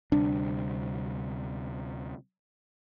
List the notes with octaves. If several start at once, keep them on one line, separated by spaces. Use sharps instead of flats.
D2 C3 G3 D4